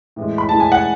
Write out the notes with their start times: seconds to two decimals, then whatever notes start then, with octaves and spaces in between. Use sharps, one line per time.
0.16 A2 E3 G#3
0.38 B5
0.49 A2 E3 G#3 A5
0.60 G#5
0.72 F#5